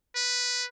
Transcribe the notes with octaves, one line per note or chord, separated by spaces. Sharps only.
B4